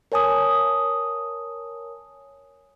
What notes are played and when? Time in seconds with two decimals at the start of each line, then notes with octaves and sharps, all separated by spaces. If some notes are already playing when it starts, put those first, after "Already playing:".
0.12 A#4 C#5 G#5 A5 D#6